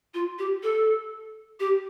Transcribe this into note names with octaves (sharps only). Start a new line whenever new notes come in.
F4
G4
A4
G4